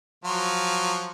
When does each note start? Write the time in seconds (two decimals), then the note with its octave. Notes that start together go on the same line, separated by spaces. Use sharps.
0.24 F3 F#3 F4